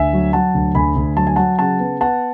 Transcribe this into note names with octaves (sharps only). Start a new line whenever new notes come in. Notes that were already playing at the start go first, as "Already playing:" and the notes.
Already playing: D2 E5 G#5
F#3
F#3 F#5 A5
D2
D2 G#5 B5
D2
F#3 A5
G#5
F#3 F#5 A5
C#3 F#5 A5
B3
B3 F#5 A5